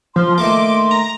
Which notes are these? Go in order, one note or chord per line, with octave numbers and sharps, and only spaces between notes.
F3 C6
D#3 A3 A#3 D6
A#5